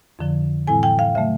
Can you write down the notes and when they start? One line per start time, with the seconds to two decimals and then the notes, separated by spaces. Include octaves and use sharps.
0.19 F2 D3 F3
0.67 A2 E3 G3 C4 E4 G#5
0.83 G5
0.99 F5
1.15 C#3 F#3 A3 E5